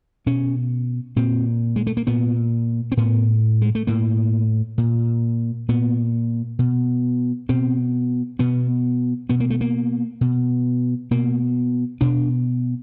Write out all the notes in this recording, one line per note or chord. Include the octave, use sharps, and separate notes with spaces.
B2 C#4
A#2 C4
G#3
A3
A#3
A#2 B3
C4
A2 B3
G#3
A3
A2 A#3
A#2
A#2 B3
B2
B2 C4
B2 B3
B2 B3
A#3
A3
A#3
B2
B2 A#3
B2 D4